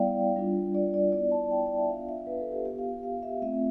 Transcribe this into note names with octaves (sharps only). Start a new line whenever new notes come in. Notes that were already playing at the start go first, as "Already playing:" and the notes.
Already playing: G3 B3 E4 D5 F5 G5
G3 D4 F4
D5
D5
B3 E4 D5
A5
G5
D5
E5
B3 D4 F4 F5
E5
B4
A4
G4
B3 F4 G4
F5
F5
E5
A3 C4 F4 E5